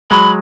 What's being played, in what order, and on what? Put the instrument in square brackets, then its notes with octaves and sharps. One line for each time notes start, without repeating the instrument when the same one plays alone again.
[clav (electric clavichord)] F#3 G#3 [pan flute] B5